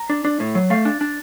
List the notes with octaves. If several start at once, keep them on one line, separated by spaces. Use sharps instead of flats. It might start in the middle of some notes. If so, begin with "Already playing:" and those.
Already playing: A#5
D4
D4
A2
F#3
A3 F5
D4
D4